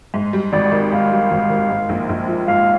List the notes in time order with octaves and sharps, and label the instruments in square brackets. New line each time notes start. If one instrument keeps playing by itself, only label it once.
[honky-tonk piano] G#2
G3
[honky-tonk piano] G#1 [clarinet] D5
[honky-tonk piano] D#3
[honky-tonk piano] G#2 [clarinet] F5
[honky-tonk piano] G3
G#1
D#3
G#2
A#1
A#1
F3
[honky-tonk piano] G#2 [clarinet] F5